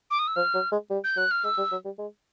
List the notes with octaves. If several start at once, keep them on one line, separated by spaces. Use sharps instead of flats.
D6
D#6
E6
F3 F6
F#3
G#3
G3
G6
F#3 F#6
F6
G#3 E6
G3
F#3
G3
G#3